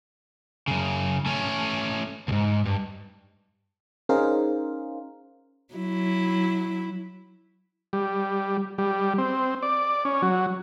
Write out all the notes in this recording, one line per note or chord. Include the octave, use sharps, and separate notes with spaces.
F#2 C#3
A3 C#4
C#2 G#2
G2
C#4 D#4 G#4 A#4 C5 F5
F#3 E4
G3
G3
C4
D5
C#4
F#3